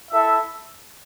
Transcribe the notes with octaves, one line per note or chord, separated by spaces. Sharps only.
E4 A4 E5